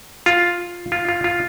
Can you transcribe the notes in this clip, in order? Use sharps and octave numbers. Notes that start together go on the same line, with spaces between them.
F4
F4
F4
F4